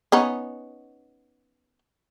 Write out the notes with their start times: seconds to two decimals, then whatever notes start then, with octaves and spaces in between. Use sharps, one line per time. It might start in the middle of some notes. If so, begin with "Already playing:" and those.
0.12 B3 C#4 D#4